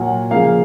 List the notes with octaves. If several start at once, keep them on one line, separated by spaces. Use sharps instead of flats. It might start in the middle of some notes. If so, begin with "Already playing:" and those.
Already playing: A#2 F#3 A#3 F#5
C#3 F3 A#3 F5